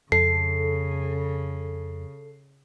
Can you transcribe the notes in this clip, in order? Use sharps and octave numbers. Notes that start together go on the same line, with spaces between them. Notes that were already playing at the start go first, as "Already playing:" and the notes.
F2 C#3 A4 C7